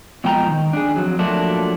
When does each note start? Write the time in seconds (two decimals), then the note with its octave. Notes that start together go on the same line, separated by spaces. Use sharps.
0.24 B2 F3 G#3 G5 A5 A#5
0.47 D#3
0.73 D4 G#4
0.96 F2 F#3
1.19 F3 F#3 A3 A#3 D4